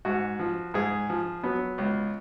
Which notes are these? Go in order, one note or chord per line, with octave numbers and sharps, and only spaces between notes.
G#2 F#4
F3
G#2 G#4
F3
F#3 B3
C#2